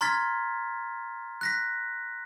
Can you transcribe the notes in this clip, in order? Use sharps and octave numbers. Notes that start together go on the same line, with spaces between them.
A#5 C6 F6 G#6 A6 B6
F#6 A#6 B6